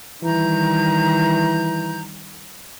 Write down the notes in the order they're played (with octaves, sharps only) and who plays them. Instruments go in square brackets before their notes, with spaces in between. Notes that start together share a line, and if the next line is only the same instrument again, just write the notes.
[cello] D#3 G3 [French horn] E3 [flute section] A#5 G6